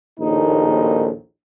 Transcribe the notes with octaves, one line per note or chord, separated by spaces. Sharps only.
A#1 D#2 A2 D#4